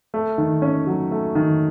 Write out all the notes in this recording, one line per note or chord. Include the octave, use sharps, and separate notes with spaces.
A3
D#3
C#4
F#3
A3
D#3